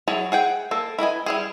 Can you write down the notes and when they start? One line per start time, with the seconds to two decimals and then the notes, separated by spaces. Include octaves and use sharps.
0.08 F#3 E4 G#4 C#5 A5
0.32 G#4 F#5 G5
0.71 A#3 A4
0.99 E4 B4 D#5 G#5
1.26 G3 E4 G#4